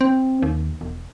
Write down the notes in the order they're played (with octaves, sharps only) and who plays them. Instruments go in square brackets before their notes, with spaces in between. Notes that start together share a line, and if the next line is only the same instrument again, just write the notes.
[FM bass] C4
D#2
E1